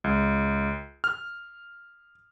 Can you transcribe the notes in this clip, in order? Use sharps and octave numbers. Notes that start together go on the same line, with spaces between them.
C#2
F6